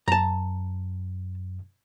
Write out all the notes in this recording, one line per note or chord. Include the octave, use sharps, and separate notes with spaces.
F#2 A5 A#5